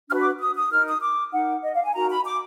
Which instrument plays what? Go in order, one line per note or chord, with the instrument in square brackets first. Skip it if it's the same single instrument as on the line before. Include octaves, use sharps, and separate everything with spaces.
[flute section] D4 F#4 B4 F6
D6
D#6
D#6
D#4 A#4 F6
D#6
D6
D#4 A#4 F#5
D#5
F5
G#5
D#4 F#4 A#4 A#5
B5
D6